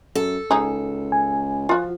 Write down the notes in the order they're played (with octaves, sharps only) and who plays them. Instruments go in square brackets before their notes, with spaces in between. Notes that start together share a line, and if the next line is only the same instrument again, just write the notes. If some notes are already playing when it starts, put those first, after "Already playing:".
[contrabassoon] F#2 [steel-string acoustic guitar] A4
[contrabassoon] C#2 [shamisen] D#4 G#4
[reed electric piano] G#5
[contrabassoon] F3 [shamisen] F4 F#4